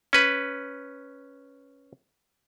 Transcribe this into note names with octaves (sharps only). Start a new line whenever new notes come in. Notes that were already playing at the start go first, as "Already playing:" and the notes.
C#4 B4